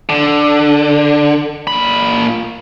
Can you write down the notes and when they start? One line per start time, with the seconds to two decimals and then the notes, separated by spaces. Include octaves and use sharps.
0.09 D3
1.67 A#2 B5